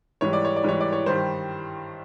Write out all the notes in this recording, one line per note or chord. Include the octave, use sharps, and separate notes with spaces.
G#2 E3 G3 C#5
D5
C#5
D5
G#2 E3 G3 C#5
D5
C#5
G2 D#3 G3 C5